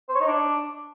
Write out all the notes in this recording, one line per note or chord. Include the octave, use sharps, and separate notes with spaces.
C5
C#5
D#4
D4